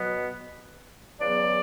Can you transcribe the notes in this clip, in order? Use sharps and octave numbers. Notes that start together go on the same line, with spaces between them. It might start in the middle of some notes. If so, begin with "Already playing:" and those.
Already playing: B2 F#3 B3
E2 C#3 F#3 B3 D5